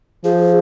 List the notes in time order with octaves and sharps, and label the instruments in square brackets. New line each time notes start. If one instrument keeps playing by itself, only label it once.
[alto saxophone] F3 [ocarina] G#4